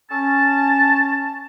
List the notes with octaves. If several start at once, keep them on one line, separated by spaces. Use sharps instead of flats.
C#4 A5